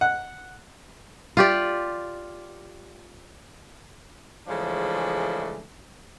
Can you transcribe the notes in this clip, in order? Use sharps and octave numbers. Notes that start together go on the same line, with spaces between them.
F#5
F4 G4 D5
C#3 E3 F3 G#3 A3 D4